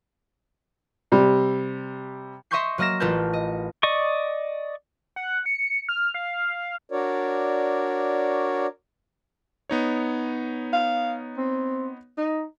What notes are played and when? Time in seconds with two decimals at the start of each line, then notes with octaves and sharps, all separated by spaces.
1.12 C3 G3
2.51 D#5 E5 C6 C#6 G6 C7
2.78 F#3 A#3 D#5 F6 A#6 E7
3.00 A1 F4 A#4 B4 A5 G6
3.33 D#5
3.83 D5 D#5 C#6
5.16 F#5
5.46 C#7
5.89 F6
6.14 F5
6.92 D4 F#4 A#4 C#5 D5
9.70 B3 D#4 C#5
10.73 F5
11.37 C4
12.17 D#4